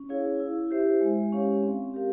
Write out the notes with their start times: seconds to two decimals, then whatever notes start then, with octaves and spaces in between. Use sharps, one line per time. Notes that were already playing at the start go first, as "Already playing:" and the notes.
Already playing: C#4
0.09 E4 G#4 C#5 F5
0.40 E4
0.71 G4 C5 E5
1.01 G#3
1.32 C#4 G4 C#5 F5
1.63 C4
1.94 G4 A#4 F5